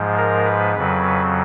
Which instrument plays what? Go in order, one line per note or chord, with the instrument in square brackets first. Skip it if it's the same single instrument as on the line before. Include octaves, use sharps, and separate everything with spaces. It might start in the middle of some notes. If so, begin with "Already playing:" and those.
Already playing: [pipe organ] G#2 F3 G#3
A#4
B4
F2 C#3 F#3 B4